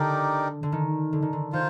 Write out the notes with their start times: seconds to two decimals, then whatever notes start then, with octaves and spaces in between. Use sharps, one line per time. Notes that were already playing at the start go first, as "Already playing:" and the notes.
Already playing: D3 D#4 G4 A#4 D5
0.63 D3
0.72 D#3
1.13 D3
1.22 D#3
1.33 D3
1.52 D#3 F4 C5